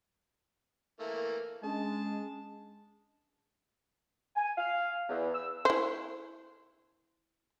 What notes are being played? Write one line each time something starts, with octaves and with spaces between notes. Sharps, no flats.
E3 A3 A#3
G#3 C#4 D4 G#4 A5
G#5
F5
E2
E6
E4 C5